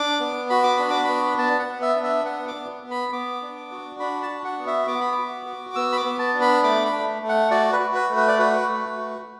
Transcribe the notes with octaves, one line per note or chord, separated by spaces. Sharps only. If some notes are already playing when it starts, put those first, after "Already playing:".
Already playing: D4 D6
B3
F#4 B5
D6
D4 B5
D6
B3 B5
B3 A5
F#5
B3
E5
D4
E5
B3 F#5
D6
B3
B3
B5
B3 D6
D4
F#4
D4 B5
A5
F#4
F#5
B3
E5
B3 D6
B5
D6
F#4
F#4
D6
B3 E6
B5
D6
B3
A5
D4
B5
A3 D6
B5
A3
A3
F#5
F#4 D5
B4
F#4
B4
A3
B4
D5
F#4 B4
A3
F#4